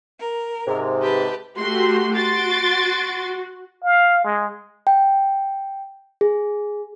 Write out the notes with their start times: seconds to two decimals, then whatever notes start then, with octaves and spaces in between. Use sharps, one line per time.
0.19 A#4
0.67 G#2 C3
1.01 G4 B4 A5
1.58 A3 F#4 G4 C6
2.15 F#4 C6 A6 D7
3.84 F5
4.24 G#3
4.87 G5
6.21 G#4